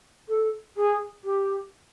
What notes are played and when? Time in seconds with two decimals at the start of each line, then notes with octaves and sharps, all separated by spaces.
0.28 A4
0.76 G#4
1.24 G4